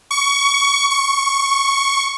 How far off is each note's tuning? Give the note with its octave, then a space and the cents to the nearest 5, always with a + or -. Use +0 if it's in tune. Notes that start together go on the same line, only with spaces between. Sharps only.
C#6 +20
C#6 +0